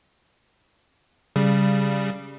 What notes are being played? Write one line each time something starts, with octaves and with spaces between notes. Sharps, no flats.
C#3 G3